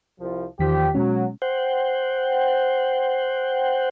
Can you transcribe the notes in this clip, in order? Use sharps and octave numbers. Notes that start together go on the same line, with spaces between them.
C2 F3
E2 A#2 D#3 F3 G4 B6
B2 F#3 G#3 C#4
C5 F#5 G5